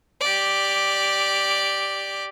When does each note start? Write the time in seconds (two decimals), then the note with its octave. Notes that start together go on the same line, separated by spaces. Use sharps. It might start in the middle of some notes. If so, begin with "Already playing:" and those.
0.20 G4 D5